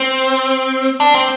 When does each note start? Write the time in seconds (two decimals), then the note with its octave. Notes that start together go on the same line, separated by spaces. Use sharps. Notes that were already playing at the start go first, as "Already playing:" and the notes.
Already playing: C4
1.00 D4
1.14 C4